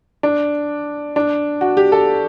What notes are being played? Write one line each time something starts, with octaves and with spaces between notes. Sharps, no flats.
D4
D4
F#4
G4
A4